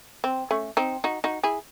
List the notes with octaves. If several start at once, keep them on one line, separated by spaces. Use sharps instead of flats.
C4
A3 C#4
C4 D#4
D#4 F#4
D#4 F#4
E4 G#4